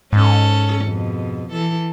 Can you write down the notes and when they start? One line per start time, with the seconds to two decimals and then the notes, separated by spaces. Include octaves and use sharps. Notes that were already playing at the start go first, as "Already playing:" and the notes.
0.13 G#2 C#4 A4
0.85 F2 B2
1.51 E3 A4